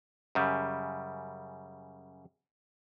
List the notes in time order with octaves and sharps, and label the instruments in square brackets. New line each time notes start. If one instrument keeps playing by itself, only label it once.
[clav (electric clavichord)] F#2 C#3 G3